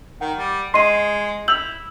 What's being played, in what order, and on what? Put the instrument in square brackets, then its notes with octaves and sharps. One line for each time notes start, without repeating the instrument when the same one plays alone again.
[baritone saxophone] D#3 [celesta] F#5
[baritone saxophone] G3
[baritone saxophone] G#3 [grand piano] D#5 C6 [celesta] C7 D#7
[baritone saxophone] E4 [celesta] E6 F#7 [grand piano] G6 F7